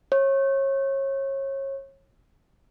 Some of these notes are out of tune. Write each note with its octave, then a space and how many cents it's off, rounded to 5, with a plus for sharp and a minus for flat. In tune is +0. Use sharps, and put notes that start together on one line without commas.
C#5 -30